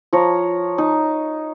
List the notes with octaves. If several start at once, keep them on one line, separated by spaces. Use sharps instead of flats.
F3 C#5 A#5
D#4